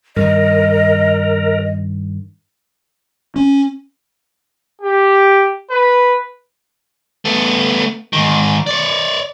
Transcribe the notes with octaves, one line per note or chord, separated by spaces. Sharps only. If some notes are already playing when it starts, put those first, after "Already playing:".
G2 D#3 A#4 D#5
C#4
G4
B4
A3 B3
G#2 D#3
C#5 D5